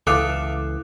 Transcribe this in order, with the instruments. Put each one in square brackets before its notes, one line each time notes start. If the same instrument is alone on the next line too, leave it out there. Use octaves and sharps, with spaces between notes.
[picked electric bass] C#2 E3 [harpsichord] A4 E5 F5 [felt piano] D6 D#6 F#6